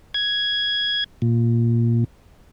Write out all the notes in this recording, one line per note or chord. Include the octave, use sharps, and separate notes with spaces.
G#6
A#2